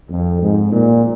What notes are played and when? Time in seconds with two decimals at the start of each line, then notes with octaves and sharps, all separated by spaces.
0.10 F2
0.42 G#2
0.72 A#2